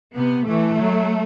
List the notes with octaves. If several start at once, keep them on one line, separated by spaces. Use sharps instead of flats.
C3 B3
E3 A3
F#3